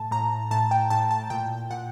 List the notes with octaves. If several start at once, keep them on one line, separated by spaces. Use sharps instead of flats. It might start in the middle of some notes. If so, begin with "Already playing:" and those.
Already playing: A2 A5
A2 A#5
A2 A5
G5
A2 A5
A5
A#2 G5
A#2 F#5